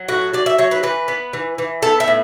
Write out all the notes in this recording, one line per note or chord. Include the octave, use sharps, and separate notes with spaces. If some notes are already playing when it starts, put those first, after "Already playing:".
Already playing: F#3
A2 F#4
F#3 D5
E5
F#3 C#5
B4
E3 B4
B3
E3
E3
B3 A4
E5
A2